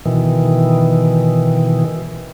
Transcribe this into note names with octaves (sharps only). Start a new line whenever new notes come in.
B2 D#3 E3